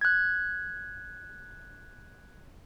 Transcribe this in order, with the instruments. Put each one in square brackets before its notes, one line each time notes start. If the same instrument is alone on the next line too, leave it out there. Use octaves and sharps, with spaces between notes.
[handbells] F#6 G#6